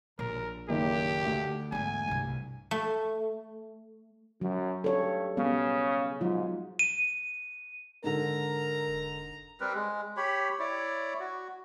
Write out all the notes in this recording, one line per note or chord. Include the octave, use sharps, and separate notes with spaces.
A#1 A#4
F#1 D#3 G4
D2
E2 G#2 G#5
C2 G2
A3
F#2 F#3
G2 A4 C#5
C#3 G3 B3
G#2 F#3 F4
D#7
G#2 D3 A#4 A#5
E1
G3 C4 A#4 B4
G#3
G4 C#5 B5
E4 C#5 D5
F#4